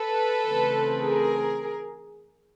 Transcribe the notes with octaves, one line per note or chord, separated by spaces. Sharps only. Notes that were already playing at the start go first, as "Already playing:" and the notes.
Already playing: A4 B4
C#3 E3 A3 C4
G#4 A#4